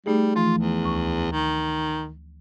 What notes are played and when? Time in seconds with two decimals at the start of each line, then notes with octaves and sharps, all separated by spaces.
0.06 G3 A3 D#4 G#4
0.36 E3 F3 A3 F4
0.57 E2
0.82 D2 C#6
1.32 D#3